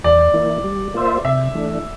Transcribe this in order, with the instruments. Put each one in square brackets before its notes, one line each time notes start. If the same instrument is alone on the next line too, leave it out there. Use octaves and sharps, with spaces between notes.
[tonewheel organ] E2 [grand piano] D5
[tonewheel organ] E3 A#3 E4
G3
A#3 F4 C5 E5
[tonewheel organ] C3 [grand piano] E5
[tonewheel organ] E3 A3 D4